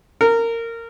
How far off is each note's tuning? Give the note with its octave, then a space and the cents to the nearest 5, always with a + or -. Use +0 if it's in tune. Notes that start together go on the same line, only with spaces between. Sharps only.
A#4 -20